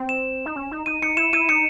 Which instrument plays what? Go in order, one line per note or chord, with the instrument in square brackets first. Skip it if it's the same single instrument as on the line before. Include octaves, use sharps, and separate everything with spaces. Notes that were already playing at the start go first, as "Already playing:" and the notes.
Already playing: [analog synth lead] C4
[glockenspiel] E7
[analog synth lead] D#4
C#4
D#4
[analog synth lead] D#4 [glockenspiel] D#7
[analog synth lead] D#4 [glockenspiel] C#7
[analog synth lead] E4 [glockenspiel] E7
[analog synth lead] E4 [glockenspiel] D#7
[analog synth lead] D#4 [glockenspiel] C#7